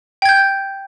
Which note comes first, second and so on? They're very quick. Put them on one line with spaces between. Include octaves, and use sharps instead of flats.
G5 G#6 G6